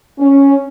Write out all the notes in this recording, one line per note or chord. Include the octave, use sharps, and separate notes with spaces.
C#4